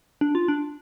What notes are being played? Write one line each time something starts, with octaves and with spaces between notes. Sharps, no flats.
D4
F4
D4